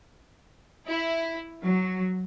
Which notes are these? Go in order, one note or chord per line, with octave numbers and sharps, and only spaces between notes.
E4
F#3